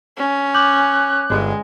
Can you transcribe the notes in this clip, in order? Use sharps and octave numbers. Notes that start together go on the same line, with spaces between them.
C#4
D6 F#6 G6 F#7
G1 G#3